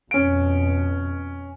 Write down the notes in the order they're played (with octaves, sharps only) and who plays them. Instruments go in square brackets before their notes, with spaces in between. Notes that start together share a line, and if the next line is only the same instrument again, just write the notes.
[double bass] F2 B2 [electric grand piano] C#4 D7